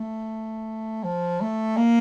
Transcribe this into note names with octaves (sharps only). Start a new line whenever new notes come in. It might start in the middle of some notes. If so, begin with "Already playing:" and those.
Already playing: A3
F3
A3
A#3